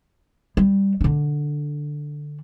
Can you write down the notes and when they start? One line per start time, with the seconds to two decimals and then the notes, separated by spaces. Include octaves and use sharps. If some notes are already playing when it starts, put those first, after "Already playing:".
0.57 G3
1.01 D3 D4